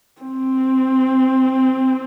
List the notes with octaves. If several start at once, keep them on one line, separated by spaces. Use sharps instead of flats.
C4